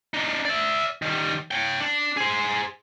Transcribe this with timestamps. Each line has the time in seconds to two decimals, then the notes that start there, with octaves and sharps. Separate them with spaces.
0.14 D4 D#4
0.45 D5 E5
1.02 D#3 G3
1.51 C#5 G5
1.80 D4
2.17 G#4 C5